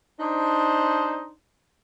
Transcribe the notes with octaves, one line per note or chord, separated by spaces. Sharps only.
D4 D#4 C5